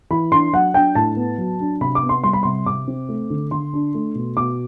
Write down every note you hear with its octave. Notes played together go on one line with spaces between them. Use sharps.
E3 B5
D4 C6
F#3 F#5
D4 G5
A2 A5
B3
F#3
D4
C3 B5
D6
B3
C6
G3 C6
B5
C3 C6
C3 D6
C4
A3
D3
D3 C6
D4
A3
B2
B2 D6